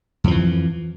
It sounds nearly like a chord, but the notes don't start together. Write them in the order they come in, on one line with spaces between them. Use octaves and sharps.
F2 F3 E3